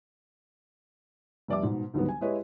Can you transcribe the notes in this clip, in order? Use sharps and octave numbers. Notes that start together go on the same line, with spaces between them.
F1 G3 D5 E5 D6
G#2 B2
D2 G#2 D#3 F#3 G3 B3
G#5
G#3 E4 G4 B4 C#5 D#5